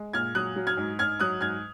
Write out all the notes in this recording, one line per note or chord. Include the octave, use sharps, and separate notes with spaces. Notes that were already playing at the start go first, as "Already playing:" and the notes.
Already playing: G#3
A#2 F6 G#6
F#3 D#6 F#6
F#3
F6 G#6
G#2
G#2 F6 G#6
F#3 D#6 F#6
G#2 F6 G#6